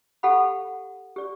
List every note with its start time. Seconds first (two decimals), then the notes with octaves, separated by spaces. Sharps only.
0.23 G4 A4 F5 F#5 B5
1.16 G4 D5